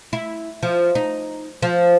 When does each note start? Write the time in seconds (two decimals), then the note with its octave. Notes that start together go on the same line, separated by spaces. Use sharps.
0.13 E4
0.63 F3
0.95 D#4
1.62 F3